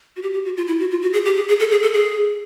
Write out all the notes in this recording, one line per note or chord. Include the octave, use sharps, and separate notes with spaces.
F#4
G4
G4
F#4
F4
E4
F#4
F4
F#4
G#4
G4
G#4
G#4
A4
G#4
A4
G#4